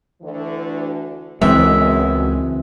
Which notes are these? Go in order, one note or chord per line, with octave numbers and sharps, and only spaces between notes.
D2 D3 E3
C#2 F#2 B2 E3 G#3 C4 E5